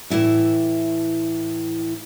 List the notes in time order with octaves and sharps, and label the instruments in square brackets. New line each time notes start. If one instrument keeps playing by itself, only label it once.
[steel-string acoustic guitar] A2 E3 E4 E5